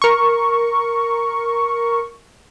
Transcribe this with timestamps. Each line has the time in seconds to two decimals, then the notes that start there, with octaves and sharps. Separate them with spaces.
0.02 A#4 C#6